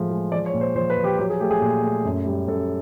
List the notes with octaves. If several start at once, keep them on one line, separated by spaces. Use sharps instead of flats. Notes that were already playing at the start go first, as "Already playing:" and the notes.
Already playing: A2 F3 G#3
G#3
F3 D5
C#5
A#2
C5
F3 C5
B4
F3
G4
F#3 G4
G#4
A3 G4
G#4
A#2
A3
F#2
G3
F#2 A4